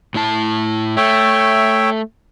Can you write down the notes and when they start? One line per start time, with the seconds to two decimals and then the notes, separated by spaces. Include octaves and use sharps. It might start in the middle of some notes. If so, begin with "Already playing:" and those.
0.14 A2 E4 A5
0.97 A3 C#5 E5 G5